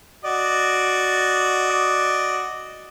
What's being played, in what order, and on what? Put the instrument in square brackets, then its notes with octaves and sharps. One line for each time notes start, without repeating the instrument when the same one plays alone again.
[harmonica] F#4 D5 D#5